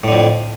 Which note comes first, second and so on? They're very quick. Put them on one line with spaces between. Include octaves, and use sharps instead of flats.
A2 D3 F2